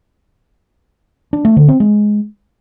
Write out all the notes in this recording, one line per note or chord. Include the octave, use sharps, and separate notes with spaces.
D4
A3
D3
C4
G#3